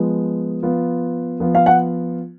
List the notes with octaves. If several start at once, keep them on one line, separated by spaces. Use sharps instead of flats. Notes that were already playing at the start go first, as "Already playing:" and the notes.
Already playing: F3 G#3 B3
F3 B3 F4
F3 B3 F4
F5
F#5